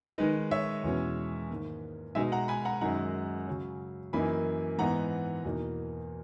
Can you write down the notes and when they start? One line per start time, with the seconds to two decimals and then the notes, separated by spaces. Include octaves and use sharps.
0.18 D#3 G#3 D#4 B4 D#5
0.51 C#5 E5
0.84 E2 B2 G#3 C#4
1.50 G#2 D#3 A#3
2.15 B2 G#3 D#4 E5 G#5
2.32 F#5 A#5
2.48 G#5 B5
2.65 F#5 A#5
2.81 F#2 D#3 G#3 D#4 F#5 A#5
3.47 C#3 F#3 C#4
4.13 F#2 E3 A#3 D#4 G#5 B5
4.78 G#2 E3 B3 D#4 F#5 A#5
5.44 E2 B2 A#3 D#4